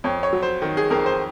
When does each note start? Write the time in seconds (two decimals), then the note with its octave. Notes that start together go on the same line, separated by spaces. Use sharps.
0.04 F2 C#5
0.23 C#5
0.33 F#3
0.43 C5
0.62 D#3
0.77 G#4
0.90 F2 A#4
1.06 C5